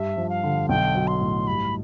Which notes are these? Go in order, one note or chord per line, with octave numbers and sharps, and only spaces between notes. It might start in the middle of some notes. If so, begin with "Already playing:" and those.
Already playing: G2 E5
F3
F5
D3
B1 G5
F#3
C6
A2
G2 B5